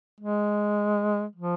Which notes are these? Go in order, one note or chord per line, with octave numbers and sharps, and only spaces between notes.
G#3
F3